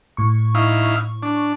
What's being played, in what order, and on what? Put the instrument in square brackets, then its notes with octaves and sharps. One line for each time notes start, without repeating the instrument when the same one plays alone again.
[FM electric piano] A2 C#6
[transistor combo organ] D#4 E4 F5
D4